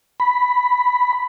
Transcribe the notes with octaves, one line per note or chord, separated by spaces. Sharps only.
B5